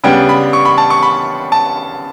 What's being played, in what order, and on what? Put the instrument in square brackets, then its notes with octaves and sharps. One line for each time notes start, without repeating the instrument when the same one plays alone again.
[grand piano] C#3 G3 B3 D4 G5
B5
C#6
B5
A5
C#6
B5
A5